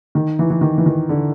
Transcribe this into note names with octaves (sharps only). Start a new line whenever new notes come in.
D#3
E3
E3
D#3
E3
D#3
D3